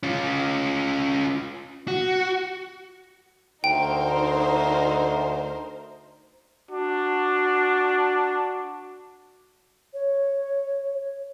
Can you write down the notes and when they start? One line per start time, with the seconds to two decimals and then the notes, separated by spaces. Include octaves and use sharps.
0.03 C#4 F4
1.88 F#4
3.64 D2 D#4 A#4 C5 G5
6.71 D4 F#4
9.94 C#5